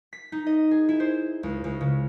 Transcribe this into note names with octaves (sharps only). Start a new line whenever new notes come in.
B6
D#4
D#5
G#4
E4
C5
C#2
C#2
C#3